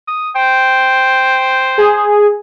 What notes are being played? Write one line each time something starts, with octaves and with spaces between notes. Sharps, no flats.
D#6
C5 G5
G#4